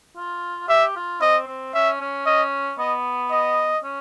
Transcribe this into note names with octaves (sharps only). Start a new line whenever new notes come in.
F4
G4 E5
F4
C4 D#5
C4
C#4 E5
C#4
C#4 D#5
B3 D#5
D#5
C#4